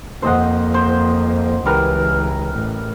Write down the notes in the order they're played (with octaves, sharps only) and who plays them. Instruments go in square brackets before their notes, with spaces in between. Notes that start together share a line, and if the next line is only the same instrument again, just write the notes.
[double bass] F2 A#3 [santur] C5 D#5 F#5
[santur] C5
[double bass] C#2 E3 [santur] G3 A#4 B4
[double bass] A1